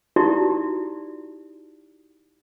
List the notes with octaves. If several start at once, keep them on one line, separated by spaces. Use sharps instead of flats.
D#4 E4 F#4 G4 D5